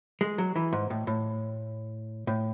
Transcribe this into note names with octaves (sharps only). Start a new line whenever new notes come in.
G#3
F#3
E3
G#2
A2
A2
A2